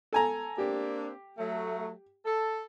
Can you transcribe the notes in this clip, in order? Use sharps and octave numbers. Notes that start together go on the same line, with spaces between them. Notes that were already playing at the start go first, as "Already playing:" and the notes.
A4 G#5 A#5
A#3 C4 D4 G4
F#3 A3
A4